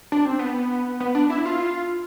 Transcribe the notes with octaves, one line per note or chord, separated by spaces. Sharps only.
D4
C4
B3
B3
D4
E4
F4